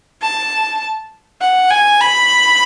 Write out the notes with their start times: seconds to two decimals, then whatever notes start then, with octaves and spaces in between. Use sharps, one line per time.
0.22 A5
1.41 F#5
1.71 G#5
2.01 B5